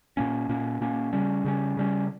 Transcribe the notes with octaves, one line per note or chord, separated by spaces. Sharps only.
A#2 A#3 C#4
A#2 A#3 C#4
A#2 A#3 C#4
C#3 G3 C#4
C#3 G3 C#4
C#3 G3 C#4